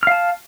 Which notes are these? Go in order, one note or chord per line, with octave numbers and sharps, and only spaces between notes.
F5 A5 F6